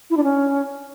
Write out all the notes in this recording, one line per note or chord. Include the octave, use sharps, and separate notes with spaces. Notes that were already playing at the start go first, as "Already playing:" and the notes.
E4
D4
C#4